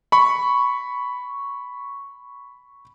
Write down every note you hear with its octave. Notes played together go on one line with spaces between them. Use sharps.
B5 C#6